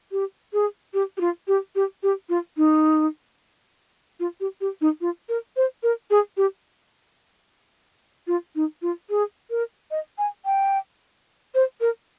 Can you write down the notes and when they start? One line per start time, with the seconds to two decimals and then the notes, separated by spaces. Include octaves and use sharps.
0.12 G4
0.53 G#4
0.94 G4
1.17 G4
1.21 F4
1.48 G4
1.75 G4
2.03 G4
2.29 F4
2.57 D#4
4.20 F4
4.40 G4
4.61 G4
4.81 D#4
5.01 F4
5.29 A#4
5.56 C5
5.83 A#4
6.10 G#4
6.37 G4
8.27 F4
8.55 D#4
8.82 F4
9.10 G#4
9.50 A#4
9.91 D#5
10.18 G#5
10.45 G5
11.55 C5
11.81 A#4